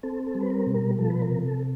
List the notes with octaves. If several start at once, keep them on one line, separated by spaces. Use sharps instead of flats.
C4 A4
A4
G3
B4
A#4
B2
A#4
F3 A4
B4
A#4
C3
A4